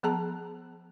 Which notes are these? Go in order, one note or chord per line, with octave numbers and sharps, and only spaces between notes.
F3 B3 G#4 A5 A#5